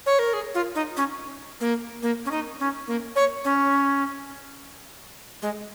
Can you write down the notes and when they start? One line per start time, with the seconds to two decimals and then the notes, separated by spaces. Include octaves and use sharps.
0.06 C#5
0.19 A#4
0.33 G#4
0.54 F4
0.75 D#4
0.97 C#4
1.60 A#3
2.02 A#3
2.25 C#4
2.31 D#4
2.60 C#4
2.87 A#3
3.16 C#5
3.44 C#4
5.42 G#3